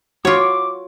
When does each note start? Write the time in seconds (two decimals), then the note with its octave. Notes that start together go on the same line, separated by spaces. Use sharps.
0.25 F4 F#4 C#5 D6